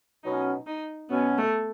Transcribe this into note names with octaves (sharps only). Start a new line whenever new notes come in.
B2 F#3 C#4 D#4
D#4
B2 F#3 B3 C#4
A3